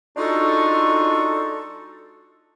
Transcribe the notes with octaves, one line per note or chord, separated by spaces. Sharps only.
G#3 D4 D#4 F4 F#4 A4